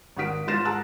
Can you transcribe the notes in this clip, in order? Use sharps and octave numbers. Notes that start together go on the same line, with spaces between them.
G#1 F#4 F#5 D#6 B6 D7
G#2 F4 C6 A6 A#6 E7
G#4 F#5 A5 A#5 E6 F#6